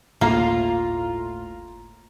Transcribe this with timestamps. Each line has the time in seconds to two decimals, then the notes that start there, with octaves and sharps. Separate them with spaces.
0.21 G1 D2 A2 A#3 F4 A#5